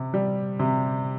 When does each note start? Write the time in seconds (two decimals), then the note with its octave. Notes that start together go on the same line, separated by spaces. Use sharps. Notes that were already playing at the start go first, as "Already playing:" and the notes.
Already playing: C3
0.14 G3
0.59 C3